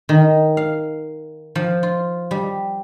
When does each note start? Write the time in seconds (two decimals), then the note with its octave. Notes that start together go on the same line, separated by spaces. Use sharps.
0.09 D#3
0.57 F5
1.55 F3
1.83 F4
2.31 G3